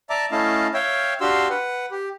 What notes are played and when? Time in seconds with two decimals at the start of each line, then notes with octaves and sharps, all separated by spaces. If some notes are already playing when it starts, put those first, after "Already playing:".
0.10 D5 E5 A5 A#5 D6
0.31 A3 C#4 E4 D#5 F5 A5
0.74 C#5 E5 F5 G5
1.21 D4 F#4 G4 F5 C6 E6
1.50 B4 F#5
1.91 G4